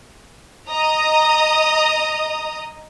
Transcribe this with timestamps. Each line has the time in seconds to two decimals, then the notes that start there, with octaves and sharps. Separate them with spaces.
0.70 D#5 A#5 D#6